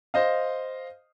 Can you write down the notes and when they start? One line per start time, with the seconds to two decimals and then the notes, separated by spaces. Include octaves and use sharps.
0.14 C5 D#5 F5